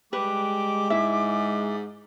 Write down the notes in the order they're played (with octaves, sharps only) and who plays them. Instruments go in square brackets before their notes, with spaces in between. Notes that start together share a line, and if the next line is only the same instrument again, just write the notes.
[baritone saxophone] G3 [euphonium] G#3 [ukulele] B4 [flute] D6
[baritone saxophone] G#2 [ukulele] E4 E5